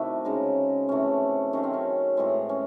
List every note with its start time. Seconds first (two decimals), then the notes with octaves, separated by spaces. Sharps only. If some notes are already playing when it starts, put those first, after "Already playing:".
Already playing: C3 D#3 A3 E4 F#4
0.25 C#3 G#3 D#4
0.89 C3 E3 A3 C#4
1.53 D#3 F#3 A3 C#4
1.63 C4
1.73 C#4
2.17 A2 E3 G#3 C4
2.49 C#4